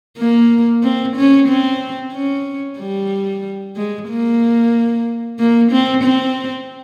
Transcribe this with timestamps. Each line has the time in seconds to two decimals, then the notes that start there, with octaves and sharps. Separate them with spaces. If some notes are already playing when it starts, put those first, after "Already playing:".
0.17 A#3
0.83 C4
1.16 C#4
1.48 C4
2.13 C#4
2.78 G3
3.76 G#3
4.09 A#3
5.39 A#3
5.71 C4
6.03 C4